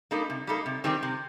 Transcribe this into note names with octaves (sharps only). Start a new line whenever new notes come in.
G3 A#3 D#4 A4
C3
G3 A#3 D#4 A4
C3
D#3 G3 C4 G4
C3